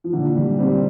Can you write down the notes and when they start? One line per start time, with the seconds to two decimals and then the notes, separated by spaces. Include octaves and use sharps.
0.04 F3
0.13 A#2 D3
0.36 D3 G3
0.59 G3 C4